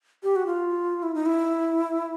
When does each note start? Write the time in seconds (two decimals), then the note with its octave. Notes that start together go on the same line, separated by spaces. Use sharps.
0.23 G4
0.36 F#4
0.46 F4
1.03 E4
1.15 D#4
1.26 E4